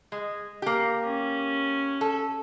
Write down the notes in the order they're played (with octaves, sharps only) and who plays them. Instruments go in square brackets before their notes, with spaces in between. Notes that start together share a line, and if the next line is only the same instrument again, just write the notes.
[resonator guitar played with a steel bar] G#3
A#3 G4
[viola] C#4
[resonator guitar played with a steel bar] A4